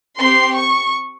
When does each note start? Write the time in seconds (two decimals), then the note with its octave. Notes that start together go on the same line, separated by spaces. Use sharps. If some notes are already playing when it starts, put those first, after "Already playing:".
0.20 C4 G4 C6
0.56 C#6